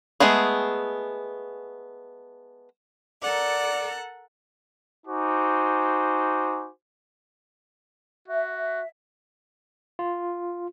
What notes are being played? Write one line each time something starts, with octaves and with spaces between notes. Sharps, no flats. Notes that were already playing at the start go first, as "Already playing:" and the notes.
G#3 A3 B3 G#4
A4 A#4 D5 F#5
D#4 F#4 C5 G#5 D6
F#4 E5
F4